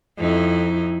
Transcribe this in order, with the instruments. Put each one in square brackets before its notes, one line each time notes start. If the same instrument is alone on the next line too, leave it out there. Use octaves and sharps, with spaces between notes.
[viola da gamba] F2 D#4 E4